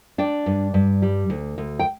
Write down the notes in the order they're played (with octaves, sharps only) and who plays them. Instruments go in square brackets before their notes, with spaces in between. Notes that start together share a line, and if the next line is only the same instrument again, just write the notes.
[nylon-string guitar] D4 D5 G5
G2
G2
G3
D2
D2
G5